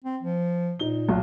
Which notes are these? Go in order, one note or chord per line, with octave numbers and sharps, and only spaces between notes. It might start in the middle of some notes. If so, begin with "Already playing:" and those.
C4
F3
A#2 D#4 G7
B1